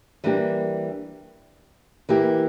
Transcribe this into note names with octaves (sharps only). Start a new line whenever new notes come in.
E3 G3 A#3 D4 G4
E3 A#3 E4 G4